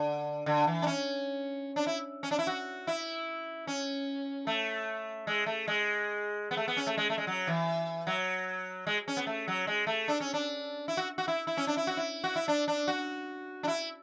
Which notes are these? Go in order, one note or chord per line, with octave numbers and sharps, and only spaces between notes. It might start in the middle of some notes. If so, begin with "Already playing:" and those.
Already playing: D3
D3
E3
D4
C#4
D4
E4
C#4
D4
E4
F#4
E4
C#4
A3
G#3
A3
G#3
B3
A3
B3
C#4
A3
G#3
A3
G#3
F#3
E3
F#3
G#3
C#4
B3
A3
F#3
G#3
A3
D4
C#4
D4
E4
F#4
F#4
E4
E4
C#4
D4
E4
F#4
E4
F#4
E4
D4
D4
F#4
D4
E4